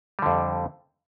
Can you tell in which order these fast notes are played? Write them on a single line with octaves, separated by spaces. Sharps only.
G3 D3 F2